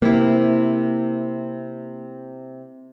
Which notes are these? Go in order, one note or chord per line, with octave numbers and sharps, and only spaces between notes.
C3 A#3 E4